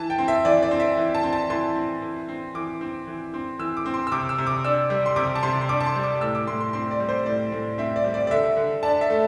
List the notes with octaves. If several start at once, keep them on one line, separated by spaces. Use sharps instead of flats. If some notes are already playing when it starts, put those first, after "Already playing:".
Already playing: E3 A5
G5
C4
E5
E3 D5
D5
C4
E5
E3
A5
C4
A5
E3 C6
C4
E3
C4
E3 D6
C4
E3
C4
E3 E6
D6
C4
C6
E6
C3 D6
E6
C3
D6
D4 E6
G3
C6
C3 D6
A5
C3 C6
C6
D4 D6
A5
C6
G3
D6
A2 E6
D6
A2 C6
C6
C4 C6
D5
G3
C5
A2 D5
A2
C4 E5
D5
G3
D5
D5
D3 E5
D3
D4 A5
E5
A3